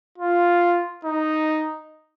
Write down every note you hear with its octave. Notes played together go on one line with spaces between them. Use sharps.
F4
D#4